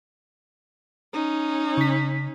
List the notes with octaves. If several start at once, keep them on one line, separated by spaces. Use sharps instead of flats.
C#4 D#4
C#3 B6